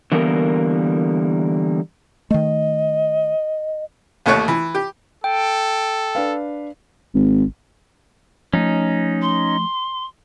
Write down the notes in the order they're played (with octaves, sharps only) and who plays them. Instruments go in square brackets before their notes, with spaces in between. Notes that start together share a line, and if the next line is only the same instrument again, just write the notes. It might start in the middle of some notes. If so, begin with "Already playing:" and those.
[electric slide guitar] D3 E3 G3 A#3 B3 A#4
[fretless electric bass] D#3 A3 [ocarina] D#5
[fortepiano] A1 D#2 A3 C#5 F#6
E3
G4
[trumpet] A4 [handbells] G5
[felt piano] D4 B4 F5
[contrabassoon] G#1
[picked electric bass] F3 A3 [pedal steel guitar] C#4 D#4
[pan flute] C6